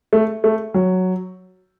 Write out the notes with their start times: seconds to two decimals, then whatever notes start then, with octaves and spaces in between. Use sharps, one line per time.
0.13 A3
0.44 A3
0.74 F#3